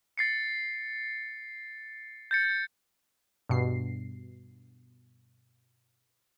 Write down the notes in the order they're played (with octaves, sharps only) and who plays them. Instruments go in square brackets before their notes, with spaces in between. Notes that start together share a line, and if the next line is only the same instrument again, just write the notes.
[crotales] A6 C7 C#7
G6 A6 C#7
[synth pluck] G2 B2 C7